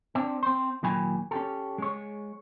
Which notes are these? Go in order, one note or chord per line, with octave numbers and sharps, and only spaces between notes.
C4 D4
C4 C5
D#2 A#2 F#3 G5 G#5 B5
C#4 G4 A4
G#3 C#5